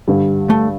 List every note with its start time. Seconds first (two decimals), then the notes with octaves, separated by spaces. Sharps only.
0.08 G2 D3 G3
0.50 A3